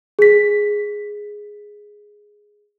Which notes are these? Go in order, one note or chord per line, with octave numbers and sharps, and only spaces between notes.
G#4 B6